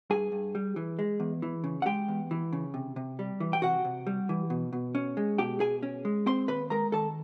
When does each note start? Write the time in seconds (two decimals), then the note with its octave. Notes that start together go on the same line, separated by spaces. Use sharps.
0.10 G2 G#4 G#5
0.32 G2
0.55 G3
0.76 E3
0.99 G#3
1.20 E2
1.42 E3
1.64 C#3
1.82 F#5
1.86 G#3 G4 G5
2.08 E2
2.31 E3
2.53 C#3
2.74 C3
2.96 C3
3.19 G3
3.40 E3
3.53 G5
3.62 C3 F#4 F#5
3.85 C3
4.07 G3
4.29 E3
4.50 B2
4.73 B2
4.95 C#4
5.17 G#3
5.38 B2 G4 G5
5.60 B2 G#4 G#5
5.83 C#4
6.05 G#3
6.26 C4 C5 C6
6.48 D#2 B4 B5
6.70 G#3 A#4 A#5
6.92 D#3 A4 A5